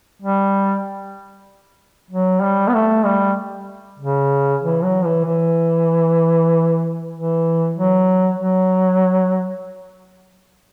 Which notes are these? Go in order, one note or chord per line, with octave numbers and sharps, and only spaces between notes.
G3
F#3
G3
B3
A3
G3
C#3
E3
F#3
E3
E3
E3
F#3
F#3